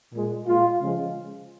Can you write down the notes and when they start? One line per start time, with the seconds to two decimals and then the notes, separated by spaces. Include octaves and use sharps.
0.12 A#2 G#3
0.46 A#2 G#3 F4
0.81 C#3 F3 G#3